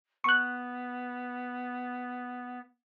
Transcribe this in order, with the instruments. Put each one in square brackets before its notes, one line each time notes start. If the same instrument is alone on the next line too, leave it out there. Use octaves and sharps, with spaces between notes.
[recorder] B3 [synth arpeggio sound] C#6 F#6